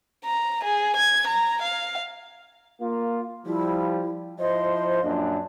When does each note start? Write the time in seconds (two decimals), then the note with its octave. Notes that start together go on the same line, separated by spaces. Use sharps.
0.25 A#5
0.64 G#4
0.96 G#6
1.27 A#5
1.62 F5
2.81 A#3 F4
3.46 F3 G3 E4
4.39 F3 E4 C5 D#5
5.03 F#2 A#2 D4